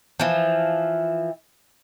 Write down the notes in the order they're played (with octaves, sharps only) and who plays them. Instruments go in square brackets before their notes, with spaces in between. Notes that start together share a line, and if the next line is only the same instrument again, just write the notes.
[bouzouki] E3 F3